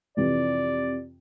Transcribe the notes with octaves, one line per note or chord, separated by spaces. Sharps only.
F2 C3 E3 D5